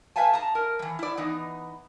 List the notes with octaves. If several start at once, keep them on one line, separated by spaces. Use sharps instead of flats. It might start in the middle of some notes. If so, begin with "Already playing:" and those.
A3 B4 E5 F5 G#5 A5
A5 A#5
A#4
E3 G3
E4 D5
E3 B3 D#4